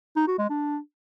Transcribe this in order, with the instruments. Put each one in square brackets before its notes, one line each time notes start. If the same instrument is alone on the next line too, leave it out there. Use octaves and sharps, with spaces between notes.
[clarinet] D#4
F#4
G#3
D4